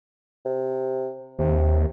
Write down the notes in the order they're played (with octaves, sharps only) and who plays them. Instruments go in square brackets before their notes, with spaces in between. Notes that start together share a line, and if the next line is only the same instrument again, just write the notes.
[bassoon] C3
[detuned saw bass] D#2 [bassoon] C3